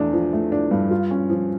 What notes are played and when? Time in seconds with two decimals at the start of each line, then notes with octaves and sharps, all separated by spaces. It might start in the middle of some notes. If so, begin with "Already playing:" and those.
Already playing: E2 A3 D4
0.13 F3
0.33 A3
0.52 D4
0.71 G2
0.91 F4
1.11 C#4
1.30 F3